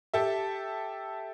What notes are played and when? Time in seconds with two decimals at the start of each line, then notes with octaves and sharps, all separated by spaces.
0.14 G4 A4 E5